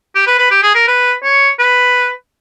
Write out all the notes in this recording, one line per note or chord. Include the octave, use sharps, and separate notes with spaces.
G4
B4
B4
G4
G#4
A#4
B4
C#5
B4